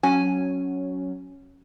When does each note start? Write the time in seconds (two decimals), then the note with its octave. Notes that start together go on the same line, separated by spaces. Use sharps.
0.03 F#3 C#4 G#5